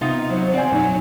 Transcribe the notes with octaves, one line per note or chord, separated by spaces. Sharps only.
C3 B3 C4 D#4 F4 E5
F#3 C5
C#3 C4 D5 F#5 G#5
F#2 B2 F#3 A#3 D#4 C#5